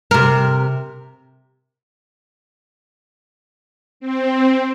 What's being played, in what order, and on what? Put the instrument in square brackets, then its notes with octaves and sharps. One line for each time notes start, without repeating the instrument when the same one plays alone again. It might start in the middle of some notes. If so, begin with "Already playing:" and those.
[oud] C3 A#4
[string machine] C4